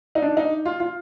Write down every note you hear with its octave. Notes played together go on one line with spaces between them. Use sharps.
D#4
D4
D#4
F4
F4